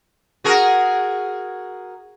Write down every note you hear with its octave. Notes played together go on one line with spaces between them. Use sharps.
F#4 G#4 A#4